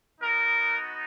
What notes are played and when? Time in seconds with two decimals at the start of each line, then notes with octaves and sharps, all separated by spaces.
0.21 B3 D#4 F#4 A#4